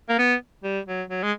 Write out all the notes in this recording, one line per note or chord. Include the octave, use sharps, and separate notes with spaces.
A#3
B3
G3
F#3
F#3
G#3